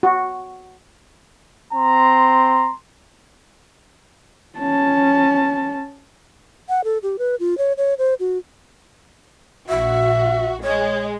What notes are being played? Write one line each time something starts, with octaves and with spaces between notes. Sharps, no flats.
F#4
C4 A#5 C6
C#4 A5
F#5
A4
G4
B4
F4
C#5
C#5
C5
F#4
A#1 F#4 E5
G#3 C#5